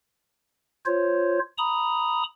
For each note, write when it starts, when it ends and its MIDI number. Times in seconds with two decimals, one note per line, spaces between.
0.86 1.39 65
0.86 1.39 72
0.86 1.39 73
1.58 2.23 82
1.58 2.23 83
1.58 2.23 87